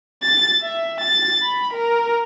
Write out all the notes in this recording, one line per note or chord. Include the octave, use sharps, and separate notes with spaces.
A6
E5
A6
B5
A#4